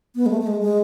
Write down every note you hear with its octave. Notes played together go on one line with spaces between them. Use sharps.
B3
G#3
A3
A3
G#3
G#3